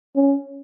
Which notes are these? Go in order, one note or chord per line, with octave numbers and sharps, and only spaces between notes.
C#4